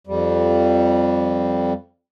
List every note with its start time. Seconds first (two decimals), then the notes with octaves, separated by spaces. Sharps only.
0.07 F2 G3